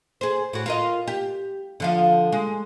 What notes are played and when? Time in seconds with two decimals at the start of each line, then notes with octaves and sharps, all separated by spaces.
0.21 G#4 C5
0.53 A2 F#4
0.66 F4 A#4 D#5
1.08 G4
1.80 D3 F3 F5
2.32 G#3